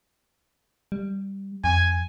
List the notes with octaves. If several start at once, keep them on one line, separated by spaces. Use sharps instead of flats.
G3
F2 G#5